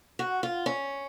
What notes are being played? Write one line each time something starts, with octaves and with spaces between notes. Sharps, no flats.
F#4
F4
C#4